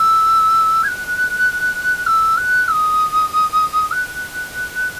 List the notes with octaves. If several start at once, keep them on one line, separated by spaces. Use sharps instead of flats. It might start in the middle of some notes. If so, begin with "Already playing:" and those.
Already playing: E6
G#6
F#6
E6
F#6
E6
D#6
F#6